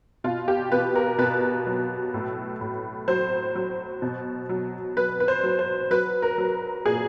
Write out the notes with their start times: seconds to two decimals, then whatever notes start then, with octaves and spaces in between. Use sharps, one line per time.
0.24 B2 F4
0.48 G4
0.72 B2 B4
0.95 A#4
1.18 B2 B4
1.67 F#3
2.14 A2
2.61 A2
3.08 F#3 C5
3.55 F#3
4.02 B2
4.49 F#3
4.97 F#3 B4
5.20 B4
5.28 C5
5.43 F#3
5.59 C5
5.90 F#3 B4
6.22 A#4
6.38 F#3
6.86 A#2 G#4